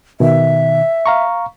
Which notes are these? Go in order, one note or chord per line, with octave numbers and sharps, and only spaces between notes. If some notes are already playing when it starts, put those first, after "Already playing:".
B2 D#3 E5
F5 A#5 C#6